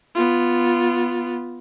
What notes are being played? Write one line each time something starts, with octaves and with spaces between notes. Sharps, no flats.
B3 F4